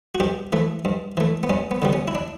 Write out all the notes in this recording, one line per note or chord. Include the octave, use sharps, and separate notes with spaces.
F#4
G2 G4
E3 A3
G2
E3 A3
B3
G2 C#4
B3
D3 G3 B3
C#4
E4
D4